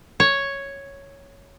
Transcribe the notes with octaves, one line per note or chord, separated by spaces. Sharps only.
C#5